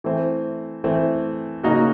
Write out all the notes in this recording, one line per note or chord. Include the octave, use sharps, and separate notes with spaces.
E3 A3 C4
E3 A3 C4
C#3 F#3 A#3 D#4 F#4